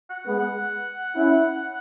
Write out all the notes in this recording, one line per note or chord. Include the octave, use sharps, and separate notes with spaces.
F#5
G#3 B3
F#5
C#4 E4